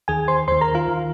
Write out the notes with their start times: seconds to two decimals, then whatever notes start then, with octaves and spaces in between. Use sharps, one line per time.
0.08 D#2 D#3 G#4 G#5
0.28 C5 C6
0.48 D#2 D#3 C5 C6
0.61 A#4 A#5
0.75 F4 F5
0.88 D#3